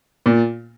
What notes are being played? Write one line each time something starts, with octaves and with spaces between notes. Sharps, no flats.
A#2